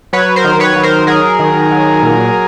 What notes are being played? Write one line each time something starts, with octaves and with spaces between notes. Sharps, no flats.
F#3 B4 C#5
A#4 C5
D#3
B4 C#5
F#3
A#4 C5
F#3 G#4 A#4
D#3
F#3
A#2